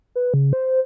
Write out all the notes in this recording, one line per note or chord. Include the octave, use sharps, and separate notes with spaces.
B4
C#3
C5